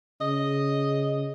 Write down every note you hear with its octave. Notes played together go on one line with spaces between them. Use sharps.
C#3 D#5